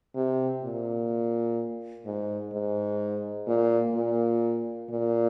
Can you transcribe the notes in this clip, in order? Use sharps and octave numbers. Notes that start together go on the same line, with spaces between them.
C3
A#2
G#2
G#2
A#2
A#2
A#2